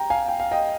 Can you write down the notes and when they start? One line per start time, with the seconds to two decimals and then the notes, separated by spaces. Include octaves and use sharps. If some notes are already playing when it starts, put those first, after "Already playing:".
Already playing: G5 A#5
0.10 F5 G#5
0.28 G5
0.40 F5
0.51 D#5 G5